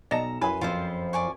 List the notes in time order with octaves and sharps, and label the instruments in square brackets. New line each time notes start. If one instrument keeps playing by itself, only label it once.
[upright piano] B1 C#7 E7 [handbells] D5 D#5 A5 [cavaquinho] A#5
[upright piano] F#2 B5 [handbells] E4 C#5 [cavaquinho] B4 G#5 C6
[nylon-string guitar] F2 F3 [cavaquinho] F4 C5
[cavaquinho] D5 G#5 C#6